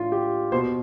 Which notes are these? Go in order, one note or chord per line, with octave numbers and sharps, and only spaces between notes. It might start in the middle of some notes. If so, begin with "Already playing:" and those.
Already playing: A2 E3 D4 F4
G4
B2 C5